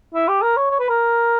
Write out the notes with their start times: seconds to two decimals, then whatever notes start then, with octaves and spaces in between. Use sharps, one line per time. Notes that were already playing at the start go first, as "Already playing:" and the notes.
0.14 E4
0.28 G4
0.42 A#4
0.57 C#5
0.71 C#5
0.80 B4
0.89 A#4